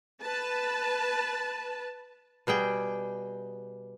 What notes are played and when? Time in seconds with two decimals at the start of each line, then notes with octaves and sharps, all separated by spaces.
0.22 B4 A5
2.47 B2 G3 G#4 G5